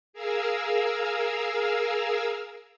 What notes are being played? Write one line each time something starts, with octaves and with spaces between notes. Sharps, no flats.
G#4 A#4 F5 E6